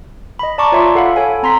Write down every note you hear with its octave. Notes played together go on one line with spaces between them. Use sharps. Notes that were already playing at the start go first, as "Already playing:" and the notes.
D#5 B5
D5 A5 A#5 C#6 D6
F4 C#5 E5 C6 D6
A4 F5 F#5 B5
A4 C#5 G#5
C4 A#5 C6 B6